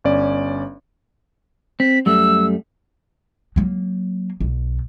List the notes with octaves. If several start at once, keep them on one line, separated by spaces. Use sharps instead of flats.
G1 C#4 D5
C4 B6
F#2 G3 A3 E6
F#3 A#3
B1